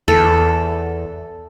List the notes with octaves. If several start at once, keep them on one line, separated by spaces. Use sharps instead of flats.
E2 A4